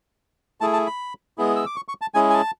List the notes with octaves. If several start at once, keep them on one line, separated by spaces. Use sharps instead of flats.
A3 E4 G#4 A5
A5
B5
G#3 B3 E4 G#4
E6
D6
C#6
C#6
A5
G#3 C#4 E4 G#4 G#5
G#5
A5